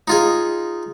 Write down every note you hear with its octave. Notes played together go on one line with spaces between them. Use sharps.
D#4 F4 G#4